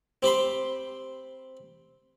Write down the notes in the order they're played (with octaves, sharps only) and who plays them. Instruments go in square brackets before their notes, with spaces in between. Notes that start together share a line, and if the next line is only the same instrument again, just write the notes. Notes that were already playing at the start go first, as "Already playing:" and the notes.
[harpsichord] C4 G4 B5 C6